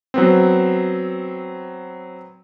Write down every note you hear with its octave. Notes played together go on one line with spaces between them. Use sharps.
F#3 B3 C4